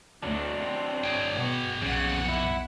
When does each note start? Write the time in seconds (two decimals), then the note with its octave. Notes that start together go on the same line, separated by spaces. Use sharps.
0.23 D2 F#3 D4
0.60 C4
1.04 G#4 G5
1.35 B2 F#4
1.82 B1 F2 A#2 C#3 F#5
2.29 E4